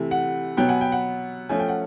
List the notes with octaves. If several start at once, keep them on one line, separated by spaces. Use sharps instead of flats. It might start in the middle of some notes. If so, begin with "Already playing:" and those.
Already playing: C3 E3 A3
F#5
B2 F#3 B3 G5
F#5 G#5
G5
F#5
F3 A3 C#4 G#5
G5
F#5